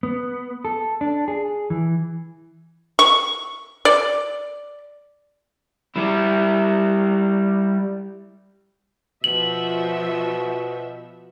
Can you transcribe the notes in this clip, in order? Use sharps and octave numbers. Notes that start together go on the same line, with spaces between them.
B3
A4
D4
G#4
E3
C#6
D5
G3 E4
B2 F3 F#4 E5 F#7